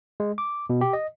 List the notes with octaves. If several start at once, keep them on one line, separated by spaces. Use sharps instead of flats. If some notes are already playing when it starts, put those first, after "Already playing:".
G#3
D6
B2
G4
D#5